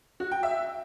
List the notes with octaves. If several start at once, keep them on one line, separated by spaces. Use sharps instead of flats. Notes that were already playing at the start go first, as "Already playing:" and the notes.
F#4
G5
E5